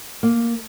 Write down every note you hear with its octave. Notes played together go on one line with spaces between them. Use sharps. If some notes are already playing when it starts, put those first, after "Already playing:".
A#3